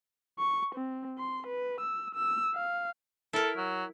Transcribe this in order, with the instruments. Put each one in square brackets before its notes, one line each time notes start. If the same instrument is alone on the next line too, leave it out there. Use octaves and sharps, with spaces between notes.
[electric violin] C#6
C4
C6
B4
E6
E6
F5
[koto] E4 A#4 [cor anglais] A4
[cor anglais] F#3